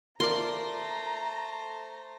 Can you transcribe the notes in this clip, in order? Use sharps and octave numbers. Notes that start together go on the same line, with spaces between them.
A3 F4 A#4 C5 D5 A#5 C6